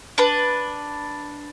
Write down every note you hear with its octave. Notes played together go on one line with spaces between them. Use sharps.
D4 B4